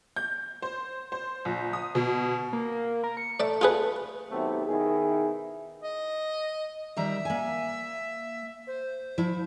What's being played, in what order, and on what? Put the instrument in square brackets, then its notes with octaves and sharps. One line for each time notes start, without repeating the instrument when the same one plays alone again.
[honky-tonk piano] G6
C5
C5
A#1
D#6
B2
[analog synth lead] A#3
A#4
C#7
[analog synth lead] A3 [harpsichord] D5 E5
[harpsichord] F4 G#4 B4
[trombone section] C3 D#3 F#3 A3 B3 G4
B2 D#3 E4 G#4
[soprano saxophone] D#5
[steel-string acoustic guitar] D#3 G3 A#5 [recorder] E5
[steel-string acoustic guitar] A#3 G#5
[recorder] C5
[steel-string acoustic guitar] F3 E4